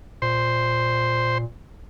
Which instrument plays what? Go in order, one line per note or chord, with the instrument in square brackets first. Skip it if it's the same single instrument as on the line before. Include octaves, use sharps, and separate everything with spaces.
[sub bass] A#2 [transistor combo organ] C5